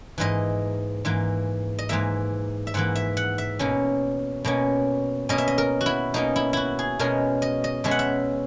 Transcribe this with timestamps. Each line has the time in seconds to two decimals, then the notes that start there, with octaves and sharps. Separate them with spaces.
0.18 G#2 E3 A#3 D#5
1.05 G#2 E3 A#3
1.79 D#5
1.89 G#2 E3 A#3 E5
2.67 E5
2.74 G#2 E3 A#3 F#5
2.95 E5
3.17 F#5
3.38 E5
3.59 B2 A#3 C#4
4.45 B2 A#3 C#4
5.29 B2 A#3 C#4 D#5
5.38 E5
5.48 D#5
5.58 A#4
5.81 F#4
5.86 E4
6.14 B2 A#3 C#4 D#4
6.36 E4
6.53 E4 F#4
6.79 G#4
6.99 B2 G#3 C#4 A#4
7.42 D#5
7.64 D#5
7.84 B2 G#3 C#4 E5
7.91 F#5
7.99 E5